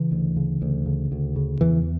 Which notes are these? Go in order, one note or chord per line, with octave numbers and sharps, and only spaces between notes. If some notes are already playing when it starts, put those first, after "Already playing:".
Already playing: C#3 E3
D2
C#3
D2
C#3
D2
C#3
E2 E3